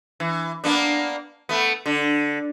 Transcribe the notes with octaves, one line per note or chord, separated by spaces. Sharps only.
E3
A#3 B3 D4
A3 B3
D3